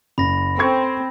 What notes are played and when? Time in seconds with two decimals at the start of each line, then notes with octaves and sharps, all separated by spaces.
0.18 F#1 B5 A#6
0.58 C4 A4 C#6 G#6